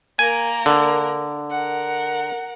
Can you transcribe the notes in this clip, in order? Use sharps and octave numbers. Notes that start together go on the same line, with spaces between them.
A#3 A#4 G#5
D3
A#4 F#5